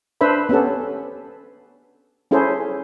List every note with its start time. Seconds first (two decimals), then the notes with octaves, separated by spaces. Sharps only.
0.21 D4 B4 C5 E5 B5
0.49 B3 C#4 G4 A4
2.31 C#4 E4 G#4 A4 C5